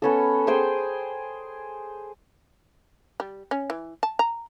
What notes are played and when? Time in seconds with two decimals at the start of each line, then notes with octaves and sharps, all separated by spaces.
0.02 B3 C#4 A4
0.47 G#4 C5 G5
3.20 G3
3.51 C#4
3.70 E3
4.03 A5
4.19 A#5